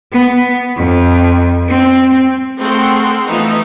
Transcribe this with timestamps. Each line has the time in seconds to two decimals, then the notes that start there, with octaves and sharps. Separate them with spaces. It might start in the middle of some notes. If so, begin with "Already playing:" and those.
0.12 B3
0.77 F2
1.68 C4
2.58 A3 C4 G#4 A#4 F#5 C6
3.26 E3 F3 A3 B3 D#4 E4